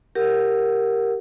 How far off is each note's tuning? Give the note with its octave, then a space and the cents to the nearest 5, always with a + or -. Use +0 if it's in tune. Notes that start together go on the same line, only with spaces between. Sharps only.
G4 +0 A#4 -5 F#5 +0